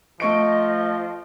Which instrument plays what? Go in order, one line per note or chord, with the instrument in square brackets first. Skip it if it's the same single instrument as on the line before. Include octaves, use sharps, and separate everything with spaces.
[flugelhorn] F3 [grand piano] A3 C#6 D7 [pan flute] D#5